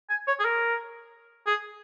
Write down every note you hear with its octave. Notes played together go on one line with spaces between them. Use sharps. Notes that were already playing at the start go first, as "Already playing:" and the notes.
G#5
C#5
G#4
A#4
G#4